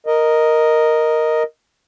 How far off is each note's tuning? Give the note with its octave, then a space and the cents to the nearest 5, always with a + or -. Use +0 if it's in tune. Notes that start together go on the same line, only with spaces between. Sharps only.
A#4 +0 D#5 +0